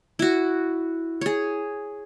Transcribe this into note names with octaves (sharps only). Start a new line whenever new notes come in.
E4 F#4
G#4 C#5